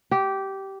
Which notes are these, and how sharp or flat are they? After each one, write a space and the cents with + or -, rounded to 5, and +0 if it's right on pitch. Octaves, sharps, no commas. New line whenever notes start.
G4 -15